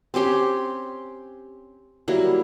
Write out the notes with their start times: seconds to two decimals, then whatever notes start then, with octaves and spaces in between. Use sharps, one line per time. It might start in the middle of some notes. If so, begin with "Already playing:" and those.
0.14 C4 C#4 G4 C6
2.08 F#3 G3 A#3 E4